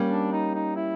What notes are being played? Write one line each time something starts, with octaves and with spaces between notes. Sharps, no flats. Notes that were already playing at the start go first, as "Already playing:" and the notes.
Already playing: G3 A#3 C#4
D4
D#4
D#4
E4